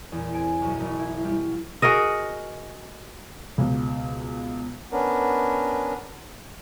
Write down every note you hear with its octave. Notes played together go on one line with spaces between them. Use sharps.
E2 A#2
C4 G#5 D7
B1 F#2
F#1
E4
G3 F4 G4
F#4 G#4 A#4 D#5
C#2 B2
B3 C#4 D4 A#4